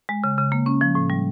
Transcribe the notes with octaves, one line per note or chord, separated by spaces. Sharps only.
G#3
C#3
C#3
A#3
C#4
F3
A2
G3